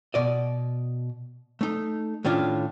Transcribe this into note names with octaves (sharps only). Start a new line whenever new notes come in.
B2 D5 D#5
A3 D#4
A2 D#3 C#4 D4 F4